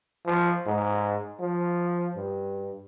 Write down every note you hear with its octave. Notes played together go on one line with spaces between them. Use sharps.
F3
G#2
F3
G2